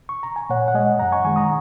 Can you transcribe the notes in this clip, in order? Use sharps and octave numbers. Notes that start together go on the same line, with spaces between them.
C#6
A#5
G#5
A#2 C#5 F#5
F#5
G#3 D#5 G#5
F#2 F#5 A#5
G#5 C#6
D#3 G#3 G#5 C#6
A#5 D#6